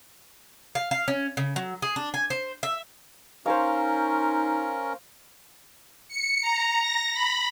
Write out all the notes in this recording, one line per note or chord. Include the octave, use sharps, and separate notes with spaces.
F5
F5
C#4
C#3
F#3
G#4
D4
G#5
C5
E5
C#4 D#4 A#4 C5 C#5 F5
C#7
A#5
A#6
B5